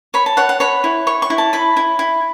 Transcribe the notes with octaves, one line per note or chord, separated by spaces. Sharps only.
C#5 B5
A5
C#5 F#5
F#5
C#5 B5
E4
C#5 C#6
C#6
E4
A5
E4 B5
E4
E4